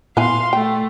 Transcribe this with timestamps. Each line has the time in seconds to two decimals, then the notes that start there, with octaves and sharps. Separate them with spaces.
0.17 A#2 B3 E4 F5 G#5 C6
0.53 A3 G5